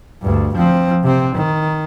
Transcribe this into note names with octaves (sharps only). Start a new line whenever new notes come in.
D2 G2
F3 C4
C3 C4
D#3